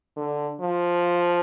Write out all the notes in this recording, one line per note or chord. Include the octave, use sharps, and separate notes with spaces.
D3
F3